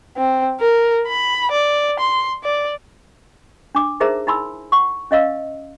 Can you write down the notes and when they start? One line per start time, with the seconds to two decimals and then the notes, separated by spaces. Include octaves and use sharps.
0.17 C4
0.61 A#4
1.08 B5
1.51 D5
1.99 C6
2.44 D5
3.75 D4 D6 D#6
4.00 D#4 G#4 A#4 C5 E5 A#5
4.27 D#4 E4 G#5 B5 C6 E6
4.72 F#5 C#6
5.11 C#4 D#5 F5 E6